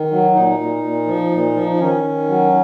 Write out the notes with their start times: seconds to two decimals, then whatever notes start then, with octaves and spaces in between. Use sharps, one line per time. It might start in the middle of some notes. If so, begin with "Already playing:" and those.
Already playing: D#3
0.11 F#3
0.34 A#2 D#4
0.59 A#2
0.84 A#2
1.07 F3
1.31 A#2
1.55 F3
1.74 D#4
1.79 D#3 C#4
2.04 D#3
2.28 F#3